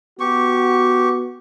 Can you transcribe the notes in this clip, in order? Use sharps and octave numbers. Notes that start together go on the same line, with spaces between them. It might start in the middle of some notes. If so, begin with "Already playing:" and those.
B3 F#4 G4 C#6